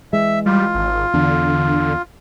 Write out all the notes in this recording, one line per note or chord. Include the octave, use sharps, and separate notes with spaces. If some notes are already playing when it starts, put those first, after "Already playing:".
E3 G#3 E5
G3 F4
G#1
E2 D3